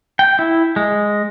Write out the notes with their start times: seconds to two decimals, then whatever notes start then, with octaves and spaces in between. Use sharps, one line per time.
0.19 G5
0.39 E4
0.76 G#3